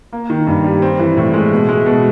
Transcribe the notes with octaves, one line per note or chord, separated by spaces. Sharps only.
A#3
D#3
G2
G3
C4
E3
A2
G#3
B2
G#3
B2